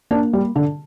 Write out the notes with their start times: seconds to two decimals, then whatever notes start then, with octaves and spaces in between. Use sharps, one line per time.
0.11 A#3 D4
0.33 G3
0.56 D3